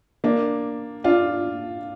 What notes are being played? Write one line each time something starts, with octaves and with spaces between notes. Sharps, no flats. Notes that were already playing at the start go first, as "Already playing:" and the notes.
A#3 D4
D4 F4